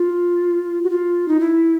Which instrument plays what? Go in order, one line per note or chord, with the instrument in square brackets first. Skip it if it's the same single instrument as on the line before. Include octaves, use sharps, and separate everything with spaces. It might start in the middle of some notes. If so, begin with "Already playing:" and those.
Already playing: [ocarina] F4
F#4
F4
D#4
E4